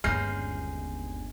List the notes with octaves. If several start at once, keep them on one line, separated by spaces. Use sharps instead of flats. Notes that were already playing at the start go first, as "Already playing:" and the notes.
G1 D#2 G#3 C#4 F6 G6 C7